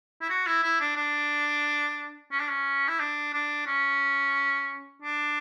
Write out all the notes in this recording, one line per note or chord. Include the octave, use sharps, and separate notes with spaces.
E4
F#4
E4
E4
D4
D4
C#4
D4
C#4
E4
D4
D4
C#4
D4